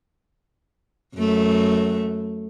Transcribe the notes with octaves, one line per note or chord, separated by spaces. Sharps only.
F#2 A3